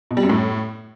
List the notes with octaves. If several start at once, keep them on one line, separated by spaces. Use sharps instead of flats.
B2
G3
F#2
A2